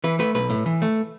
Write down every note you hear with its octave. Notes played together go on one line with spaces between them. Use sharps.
E3 B4
A3 B4
B1 B4
A2
E3
A3